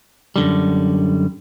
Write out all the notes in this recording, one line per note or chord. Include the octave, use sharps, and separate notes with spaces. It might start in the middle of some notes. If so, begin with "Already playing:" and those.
F#2 D3 G3